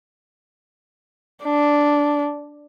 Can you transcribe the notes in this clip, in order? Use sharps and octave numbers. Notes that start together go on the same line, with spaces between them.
D4